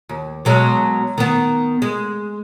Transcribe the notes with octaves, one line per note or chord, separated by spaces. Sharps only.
D#2
B2 F#3 G#3
D#3 B3
G#3